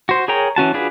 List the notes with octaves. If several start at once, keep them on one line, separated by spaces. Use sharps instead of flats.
F#4 C5
G#4 A#4 C#5 G5 A#5
E3 C#4 F#4 A5
D4 F4 F#4 G#4 B4